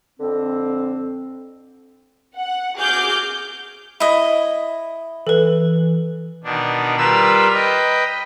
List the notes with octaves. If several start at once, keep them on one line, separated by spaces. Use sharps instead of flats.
F2 D3 C4
F#5
F#4 G#4 D6 F6 G6
E4 D#5
E3 A4 B4
B2 D#3 D4
G3 F4 A#4 B4 E6
B4 D#5 G5